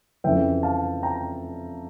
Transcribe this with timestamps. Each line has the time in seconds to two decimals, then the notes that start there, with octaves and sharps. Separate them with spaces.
0.24 F2 C#3 E3 E5 G5
0.63 F5 A5
1.03 G5 A#5